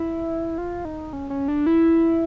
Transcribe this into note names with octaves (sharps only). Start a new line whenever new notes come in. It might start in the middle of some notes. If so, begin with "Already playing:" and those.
Already playing: E4
F4
D#4
C#4
C#4
D4
E4